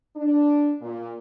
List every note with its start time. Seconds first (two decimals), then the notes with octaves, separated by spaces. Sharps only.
0.16 D4
0.81 A#2